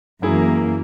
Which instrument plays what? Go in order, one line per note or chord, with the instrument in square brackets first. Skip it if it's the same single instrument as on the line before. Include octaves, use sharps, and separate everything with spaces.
[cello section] F#2 E3 A#3 [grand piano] F#3 E4 G#4